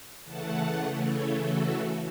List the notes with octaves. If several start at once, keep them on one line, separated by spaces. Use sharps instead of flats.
C#3 E3 A3 F#5 A5
A4 C#5
F#4 A4